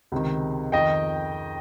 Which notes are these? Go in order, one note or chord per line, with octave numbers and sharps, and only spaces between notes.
C#2 C3 D#3
F2 D#3 D#5 G5